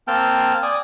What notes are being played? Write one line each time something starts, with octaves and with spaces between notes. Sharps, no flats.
A#3 C4 G5 A5 F6
D5 G#5 D#6